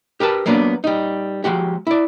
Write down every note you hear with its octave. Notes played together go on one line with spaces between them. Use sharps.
G4 A#4 B4 A5
F#3 A#3 B3 D4 D5
G3 D#4
F3 G#3 F#4 G4
E4 D5